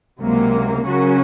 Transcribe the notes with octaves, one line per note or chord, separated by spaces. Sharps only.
C#2 C3 F#3 A#3
C#3 F#3 C#4 F#4 A#4